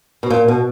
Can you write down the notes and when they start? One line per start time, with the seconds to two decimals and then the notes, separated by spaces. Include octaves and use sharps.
0.23 B2
0.30 A#2
0.48 B2